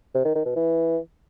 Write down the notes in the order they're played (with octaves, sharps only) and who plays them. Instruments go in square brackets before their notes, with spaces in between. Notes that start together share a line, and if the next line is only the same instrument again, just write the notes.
[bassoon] C3
D#3
D#3
B2
E3